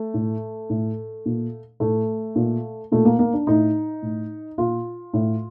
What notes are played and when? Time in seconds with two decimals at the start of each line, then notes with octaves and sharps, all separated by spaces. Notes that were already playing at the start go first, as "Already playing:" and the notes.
Already playing: A3
0.14 A2
0.70 A2
1.26 A#2
1.80 A2 A3
2.36 A#2
2.92 A#2 A3
3.05 A#3
3.19 A#3
3.33 D4
3.47 A2 D#4
4.02 A2
4.58 A#2 F4
5.14 A2